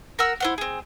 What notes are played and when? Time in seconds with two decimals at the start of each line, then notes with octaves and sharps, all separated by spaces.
0.19 A#4 F#5 E6
0.40 E4 C5 F#5
0.58 C4 G#4